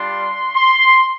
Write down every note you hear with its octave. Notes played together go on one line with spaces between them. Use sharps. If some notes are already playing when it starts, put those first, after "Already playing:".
Already playing: G3 D4 F4 C6
C6